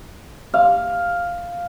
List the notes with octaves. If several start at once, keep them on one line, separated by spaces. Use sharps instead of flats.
F5